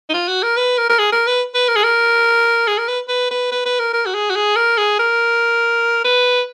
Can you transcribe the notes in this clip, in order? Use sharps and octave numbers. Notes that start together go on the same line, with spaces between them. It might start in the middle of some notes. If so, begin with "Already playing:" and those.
D#4
F4
F#4
A#4
B4
A#4
A#4
G#4
A#4
B4
B4
A#4
G#4
A#4
G#4
A#4
B4
B4
B4
B4
B4
A#4
A#4
F#4
G#4
F#4
G#4
A#4
G#4
A#4
B4